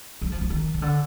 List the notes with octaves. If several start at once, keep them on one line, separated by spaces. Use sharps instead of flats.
F#3
F3
E3
D#3
C#3
D3